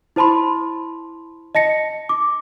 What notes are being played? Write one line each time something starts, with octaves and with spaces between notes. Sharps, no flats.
E4 C5 A5 B5 C6
D#5 A5 A#6 C#7
D6